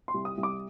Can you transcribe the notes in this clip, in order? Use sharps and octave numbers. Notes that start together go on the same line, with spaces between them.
C6
C2
D#6
C2
D6